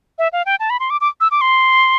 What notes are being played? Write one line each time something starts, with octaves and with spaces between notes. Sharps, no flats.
E5
F5
G5
A5
B5
C6
D6
D6
E6
D6
C6